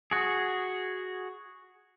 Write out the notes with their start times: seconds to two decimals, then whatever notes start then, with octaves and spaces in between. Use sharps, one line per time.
0.11 F#4 G#4